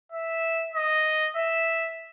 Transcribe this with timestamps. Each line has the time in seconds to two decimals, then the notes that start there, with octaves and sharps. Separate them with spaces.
0.12 E5
0.74 D#5
1.36 E5